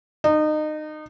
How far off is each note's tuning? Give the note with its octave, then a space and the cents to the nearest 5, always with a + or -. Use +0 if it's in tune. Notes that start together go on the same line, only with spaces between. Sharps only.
D#4 -25